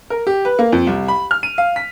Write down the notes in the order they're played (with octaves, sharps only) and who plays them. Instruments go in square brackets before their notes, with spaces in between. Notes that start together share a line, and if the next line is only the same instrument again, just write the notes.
[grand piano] A#4
G4
B4
A#3
F2
C2
B5
F6
D#7
F5
B6